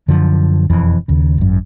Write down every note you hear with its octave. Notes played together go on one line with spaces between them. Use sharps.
F#2 D3 F3
E1 F2 E3
D#2 C#3
G#1 F#2